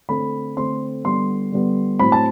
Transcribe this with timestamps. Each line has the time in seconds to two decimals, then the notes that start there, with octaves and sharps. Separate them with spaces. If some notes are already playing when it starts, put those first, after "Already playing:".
0.09 D3 A3 C4 B5
0.57 D3 A3 C4 C6
1.04 D3 G3 B3 C6
1.52 D3 G3 B3
1.99 A2 F#3 C4 B5
2.12 A5